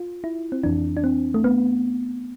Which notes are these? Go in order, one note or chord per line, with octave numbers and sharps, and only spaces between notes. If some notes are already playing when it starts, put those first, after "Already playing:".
Already playing: F4
E4
C4
F2 E3 D4
D4
C4
A3
B3